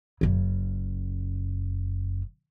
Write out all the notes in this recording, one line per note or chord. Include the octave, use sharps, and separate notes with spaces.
F#1 C#3